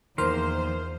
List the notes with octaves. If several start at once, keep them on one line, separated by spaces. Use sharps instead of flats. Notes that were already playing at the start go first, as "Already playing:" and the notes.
E2 D#3 F3 A#3 A#4 C5 C6 F6